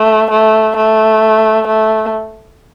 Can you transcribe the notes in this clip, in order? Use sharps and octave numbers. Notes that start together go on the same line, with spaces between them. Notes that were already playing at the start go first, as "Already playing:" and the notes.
Already playing: A3
A3
A3
A3